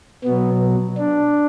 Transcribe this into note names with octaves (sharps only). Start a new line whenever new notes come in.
B2 F#3 B3
D4